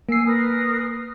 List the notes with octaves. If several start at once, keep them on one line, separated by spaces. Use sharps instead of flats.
A#3 G#5 E6 C7
A#4 B4 D#6